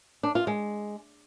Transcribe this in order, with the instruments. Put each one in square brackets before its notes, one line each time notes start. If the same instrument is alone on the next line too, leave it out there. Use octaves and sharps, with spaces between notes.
[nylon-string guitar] D4
F4
G#3